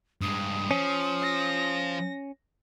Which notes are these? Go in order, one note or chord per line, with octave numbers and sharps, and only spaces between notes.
G2 G#3 D#6
F3 C#4
A#6